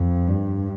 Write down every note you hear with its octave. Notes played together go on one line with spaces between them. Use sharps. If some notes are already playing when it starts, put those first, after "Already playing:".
Already playing: F2
G2